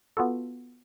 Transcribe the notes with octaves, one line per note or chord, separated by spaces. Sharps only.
B3 F4 F#4 A4